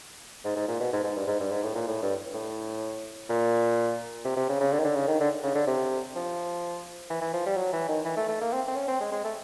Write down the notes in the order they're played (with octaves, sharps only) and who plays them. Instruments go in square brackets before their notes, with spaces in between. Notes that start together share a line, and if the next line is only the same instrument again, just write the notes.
[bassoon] G#2
G#2
A#2
B2
G#2
G#2
G2
G#2
G2
G#2
A2
A#2
A2
G2
A2
A#2
C3
C3
C#3
C#3
D3
D#3
D3
C#3
D#3
D3
C#3
D3
C3
F3
E3
E3
F3
G3
F#3
E3
D#3
E3
A3
A3
A#3
C4
C4
C#4
C4
G#3
G#3
A3